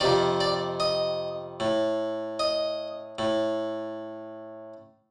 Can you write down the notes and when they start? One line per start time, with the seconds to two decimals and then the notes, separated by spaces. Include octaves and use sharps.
0.01 F2 C3 D#3 D5
0.40 D5
0.80 D#5
1.60 A2
2.39 D#5
3.19 A2